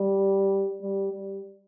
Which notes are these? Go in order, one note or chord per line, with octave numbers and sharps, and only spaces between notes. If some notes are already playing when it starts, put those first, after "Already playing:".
Already playing: G3
G3
G3